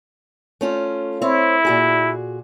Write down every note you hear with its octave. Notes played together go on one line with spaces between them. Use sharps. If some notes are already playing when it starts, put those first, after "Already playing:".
A3 C#4 F4
C4 E4 C#5 E5
A#2 F#4 G#4